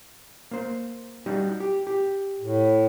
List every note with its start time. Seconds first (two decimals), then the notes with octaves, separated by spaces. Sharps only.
0.51 A#3 C5
1.26 G3 D#4 F#4
1.60 G4
1.87 G4
2.41 A2